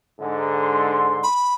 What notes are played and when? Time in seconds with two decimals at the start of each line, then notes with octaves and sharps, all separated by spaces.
0.20 G#2 D3
0.63 C6
1.23 B5